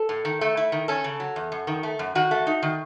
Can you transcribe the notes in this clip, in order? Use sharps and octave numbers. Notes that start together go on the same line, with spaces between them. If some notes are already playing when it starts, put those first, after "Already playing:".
Already playing: A4
A2
D#3
A3
E4
D#3
C#4 A4
C#3
F#3
E2
F#2
D#3
A3
F#2
D#3 F#4
A3
D#4
D#3